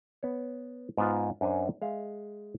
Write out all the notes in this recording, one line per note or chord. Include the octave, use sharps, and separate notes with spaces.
B3 C#5
G#2 B3 F4
F#2 D4 C5 F#5 G#5
G#3 E5 F5